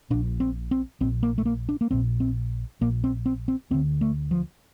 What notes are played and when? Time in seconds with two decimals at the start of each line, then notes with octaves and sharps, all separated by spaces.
0.10 A#1 A#2 D4
0.40 C4
0.71 C4
1.00 A#1 A#2 C4
1.23 A#3
1.38 A3
1.46 A#3
1.69 D4
1.81 A#3
1.91 A#1 A#2 C4
2.20 C4
2.81 A#1 A#2 A#3
3.04 C4
3.26 C4
3.48 C4
3.71 D2 D3 C4
4.01 A3
4.31 F3